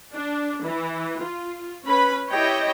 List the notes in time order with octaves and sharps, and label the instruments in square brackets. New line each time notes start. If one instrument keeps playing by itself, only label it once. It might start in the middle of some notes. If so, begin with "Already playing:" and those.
[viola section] D4
E3
F4
C#4 B4 B5
E4 G4 C#5 D#5 G5